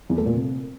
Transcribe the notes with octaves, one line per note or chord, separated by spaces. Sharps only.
E2
A3
A#2
C3